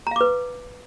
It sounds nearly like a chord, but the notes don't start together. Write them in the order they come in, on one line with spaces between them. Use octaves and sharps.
A#5 F5 D6 B4